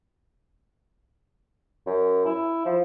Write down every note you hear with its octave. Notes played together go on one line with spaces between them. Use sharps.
F#2
E4
F3